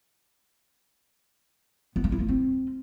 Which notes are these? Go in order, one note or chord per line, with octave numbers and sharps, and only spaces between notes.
B3
G#3
E4
A#3
C4